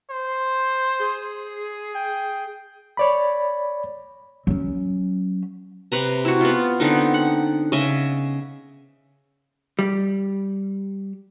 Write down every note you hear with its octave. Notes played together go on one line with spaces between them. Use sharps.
C5
G#4
G5
C#5 D5 B5
F#3 C#4
C3 B4 A#5
E4 F#4
B3 F4
D3 B3 C4 D#4
F#5
C#3 D#5 E5
G3